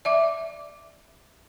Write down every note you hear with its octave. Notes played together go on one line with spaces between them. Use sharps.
D5 E5 D6